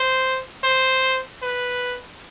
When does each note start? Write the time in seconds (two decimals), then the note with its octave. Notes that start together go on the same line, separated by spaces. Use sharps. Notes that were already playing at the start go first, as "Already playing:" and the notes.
Already playing: C5
0.64 C5
1.42 B4